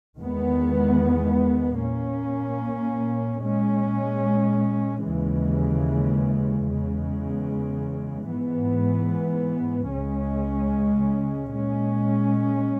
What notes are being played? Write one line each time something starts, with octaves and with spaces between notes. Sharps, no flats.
E2 D#3 G#3 B3
A#2 A#3 C#4
A#2 G#3 C#4
D#2 C#3 E3 G#3
E2 C#3 G#3
G#2 E3 B3
C#2 C#3 G#3 C#4
A#2 G#3 C#4